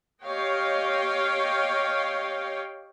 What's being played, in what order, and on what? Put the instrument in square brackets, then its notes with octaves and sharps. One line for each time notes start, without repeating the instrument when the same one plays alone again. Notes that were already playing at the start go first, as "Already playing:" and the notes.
[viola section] G4 C#5 D#5 F5 G5